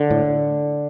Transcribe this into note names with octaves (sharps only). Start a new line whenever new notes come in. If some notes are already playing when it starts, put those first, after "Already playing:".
Already playing: D3
A2